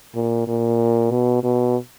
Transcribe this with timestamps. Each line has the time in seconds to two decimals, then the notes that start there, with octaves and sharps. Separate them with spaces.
0.15 A#2
0.48 A#2
1.11 B2
1.43 B2